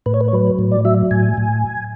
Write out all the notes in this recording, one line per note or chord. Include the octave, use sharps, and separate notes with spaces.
A2 B4
C#5
B4
C#5
F#3 B4
A2
D5
F#3 E5
A2 G#5
A2